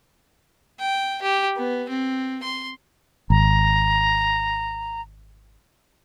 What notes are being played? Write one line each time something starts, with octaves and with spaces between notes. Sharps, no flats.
G5
G4
B3
C4
C6
G#1 A#5